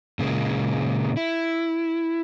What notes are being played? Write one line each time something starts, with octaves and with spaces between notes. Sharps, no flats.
A#2 C#3 G#3 A#3
E4